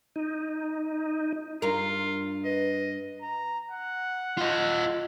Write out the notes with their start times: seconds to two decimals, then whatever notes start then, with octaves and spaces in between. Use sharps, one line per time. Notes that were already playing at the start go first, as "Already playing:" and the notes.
0.16 D#4
1.62 G2 F4 A#4
2.45 B4 D#5
3.22 A#5
3.71 F#5
4.38 F4 D#5